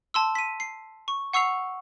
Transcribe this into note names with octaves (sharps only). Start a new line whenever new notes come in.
A5 C6 E6
B6 D#7
C7
C#6
F#5 C#6 E6 C7 F7